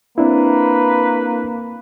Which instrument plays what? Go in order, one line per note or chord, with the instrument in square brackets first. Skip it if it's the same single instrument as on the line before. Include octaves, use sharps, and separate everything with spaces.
[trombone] A#3 [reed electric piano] C4 D4 E4 [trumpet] B4